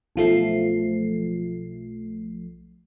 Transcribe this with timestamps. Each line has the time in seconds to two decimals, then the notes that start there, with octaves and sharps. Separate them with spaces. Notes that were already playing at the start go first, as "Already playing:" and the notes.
0.16 B1 F3 A3 C7